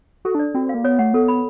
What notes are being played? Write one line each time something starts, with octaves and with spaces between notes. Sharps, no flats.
F#4 A4
D4
D5
C4 F#4
A#3 F5
B3 C#5
A3 F#5
B3 A4
B5